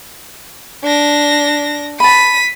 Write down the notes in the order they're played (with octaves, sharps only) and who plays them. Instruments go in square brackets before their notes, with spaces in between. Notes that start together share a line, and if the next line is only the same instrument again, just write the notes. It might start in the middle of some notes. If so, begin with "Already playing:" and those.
[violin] D4 A#6
[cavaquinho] A5 B5 [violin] B6 D#7